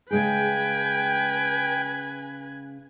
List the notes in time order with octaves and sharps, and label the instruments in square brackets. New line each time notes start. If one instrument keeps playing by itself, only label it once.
[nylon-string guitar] C#3 G#3 G#4 [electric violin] B4 G#5 [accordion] G5